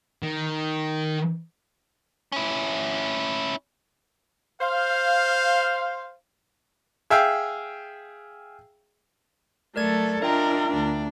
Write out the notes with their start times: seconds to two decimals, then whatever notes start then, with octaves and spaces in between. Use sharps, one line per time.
0.22 D#3
2.32 C#4 E4
4.61 C5 F5
7.10 G#4 E5 F5 G5
9.76 F#3 A3 A4 A#4 D5 G#6
10.22 D4 F4 A#4 D#5 E5 G5 A#5
10.72 D2 D4